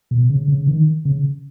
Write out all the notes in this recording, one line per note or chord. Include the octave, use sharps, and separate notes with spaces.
B2
C#3
C#3
D#3
C#3